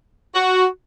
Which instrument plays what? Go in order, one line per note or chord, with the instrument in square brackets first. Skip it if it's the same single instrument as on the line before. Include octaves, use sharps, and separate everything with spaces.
[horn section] F#4